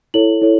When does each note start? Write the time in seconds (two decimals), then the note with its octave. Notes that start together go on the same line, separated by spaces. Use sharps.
0.14 E4 A4 C#5 F#7
0.42 E4 A4 C#5